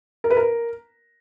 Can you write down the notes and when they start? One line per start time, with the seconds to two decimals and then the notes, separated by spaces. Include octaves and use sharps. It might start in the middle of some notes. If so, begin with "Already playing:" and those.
0.24 A#4
0.30 B4
0.37 A#4